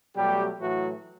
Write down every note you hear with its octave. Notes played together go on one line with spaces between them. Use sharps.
B2 F#3 G3 A3 G4
A2 E3 F#3 A3 F#4